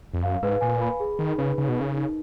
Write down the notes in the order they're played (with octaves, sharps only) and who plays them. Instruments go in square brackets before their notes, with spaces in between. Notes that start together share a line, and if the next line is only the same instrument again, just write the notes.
[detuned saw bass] F2
[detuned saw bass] F#2 [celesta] F5
[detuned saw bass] G#2 [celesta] B4
[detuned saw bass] A#2 [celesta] G#5
[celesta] B5
G#4
[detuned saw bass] D#3 [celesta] D#4
[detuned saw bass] C#3 [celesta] B4
[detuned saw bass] C#3 [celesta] D#4
[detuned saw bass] B2
[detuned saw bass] C#3 [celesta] A#4
[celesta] D#4